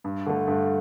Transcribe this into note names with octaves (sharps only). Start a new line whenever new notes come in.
G2
D3 A3
G2